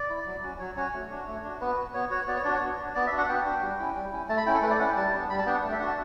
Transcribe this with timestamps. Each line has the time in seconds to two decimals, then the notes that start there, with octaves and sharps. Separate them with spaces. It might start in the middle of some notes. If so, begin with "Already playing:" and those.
Already playing: D5
0.10 E4
0.26 F#3
0.44 C#4 F#4
0.59 F#3 C#5
0.77 C#4 F#4 C#5
0.94 A3
1.10 D4 F#4
1.27 A3
1.43 D4 F#4
1.61 B3 B4
1.77 F#4
1.94 B3 C#5
2.10 F#4 C#5
2.28 B3 D5
2.37 C#5
2.44 D4 F#4 D5
2.53 C#5
2.61 B3
2.78 D4 F#4
2.95 B3 D5
3.07 E5
3.12 D4 F#4
3.18 F#5
3.29 B3 G5
3.45 D4 F#4
3.62 G3
3.79 C#4 E4
3.95 G3
4.12 C#4 E4
4.29 A3 A5
4.38 B5
4.46 C#4 E4 G5
4.54 A4
4.62 A3 B4
4.70 D5
4.79 C#4 E4 F#5
4.88 G5
4.96 G3 A5
5.14 B3 D4
5.30 G3 B5
5.38 A5
5.46 B3 D4 G5
5.54 F#5
5.64 A3
5.72 E5
5.80 D4 F#4 F#5
5.88 A5